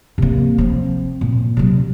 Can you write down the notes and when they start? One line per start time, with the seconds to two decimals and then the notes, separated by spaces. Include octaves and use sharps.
0.18 C3 A#3
0.58 F3 C4
1.21 A#2
1.57 C3 F#3